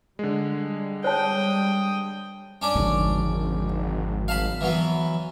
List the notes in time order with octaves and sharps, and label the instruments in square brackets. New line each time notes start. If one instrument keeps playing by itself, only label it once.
[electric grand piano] D3 G#3 [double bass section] G3
[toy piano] C5 C#5 A5 [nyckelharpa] G5 D#6
[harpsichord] C#4 D4 D5
[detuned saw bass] G#1 [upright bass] F2 D3
[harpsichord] F5 A5 B5
E3 F#3 B3